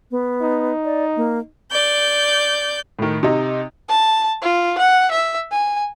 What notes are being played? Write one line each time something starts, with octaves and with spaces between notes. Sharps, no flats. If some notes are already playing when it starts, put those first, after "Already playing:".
B3
D#4
D5
A#3
D5 G6
A2 D#3
C3 D#4
A5
F4
F#5
E5
G#5